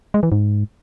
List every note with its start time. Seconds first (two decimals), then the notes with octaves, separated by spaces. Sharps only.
0.14 G#3
0.23 E3
0.32 G#2